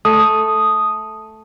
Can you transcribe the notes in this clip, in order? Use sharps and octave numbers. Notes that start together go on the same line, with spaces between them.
A3 D#6